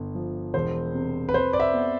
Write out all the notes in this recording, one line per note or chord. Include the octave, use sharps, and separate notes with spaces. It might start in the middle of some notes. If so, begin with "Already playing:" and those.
Already playing: G1
F3
E1 C5
C3
B4
F2 C5
D5
E5
B3